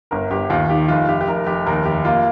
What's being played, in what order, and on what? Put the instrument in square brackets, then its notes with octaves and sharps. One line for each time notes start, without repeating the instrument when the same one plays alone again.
[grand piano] G1 A#4
G1 G4
D#2 F4
D#3 G4
F1 F4
F1 G4
G4
F1 A#4
F1 G4
D#2 A#4
F1 G4
A#3 F4